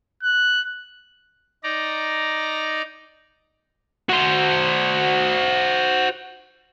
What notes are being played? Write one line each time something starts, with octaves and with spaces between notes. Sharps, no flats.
F#6
D#4 D5 A#5
F#4 C5